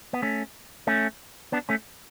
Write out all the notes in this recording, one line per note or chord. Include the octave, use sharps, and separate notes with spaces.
B3
A3 C#4
A3 C#4
B3 D4
A3 C#4